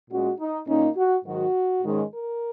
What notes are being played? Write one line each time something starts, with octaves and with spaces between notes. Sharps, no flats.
A#2 G#3 C#4 F#4
D#4
A#2 A#3 C#4 D#4
F#4
G#2 D#3 F#3 F#4
G#2 D#3 G#3 C#4
A#4